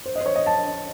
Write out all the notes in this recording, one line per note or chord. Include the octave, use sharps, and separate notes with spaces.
C5
D#5
C5
C#5
D#5
A5